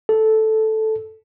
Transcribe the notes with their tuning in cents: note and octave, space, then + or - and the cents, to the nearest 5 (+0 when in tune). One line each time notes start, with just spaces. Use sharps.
A4 -5